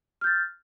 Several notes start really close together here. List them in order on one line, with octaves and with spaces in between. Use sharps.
F6 G6 A6